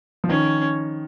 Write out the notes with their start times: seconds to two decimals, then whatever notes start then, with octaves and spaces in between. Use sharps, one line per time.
0.24 F3
0.29 D#3 C#4